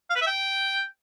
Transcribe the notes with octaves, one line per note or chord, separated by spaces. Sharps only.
F5
B4
E5
G5